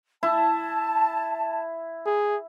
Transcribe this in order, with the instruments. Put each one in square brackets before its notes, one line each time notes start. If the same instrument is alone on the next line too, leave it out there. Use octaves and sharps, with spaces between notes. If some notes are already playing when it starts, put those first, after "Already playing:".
[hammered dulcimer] E4 [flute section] A5
[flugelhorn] G#4